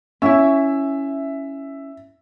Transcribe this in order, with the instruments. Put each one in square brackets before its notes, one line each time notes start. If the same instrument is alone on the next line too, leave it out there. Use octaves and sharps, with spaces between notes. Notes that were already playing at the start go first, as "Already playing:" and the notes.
[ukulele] C#4 E4 [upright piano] E5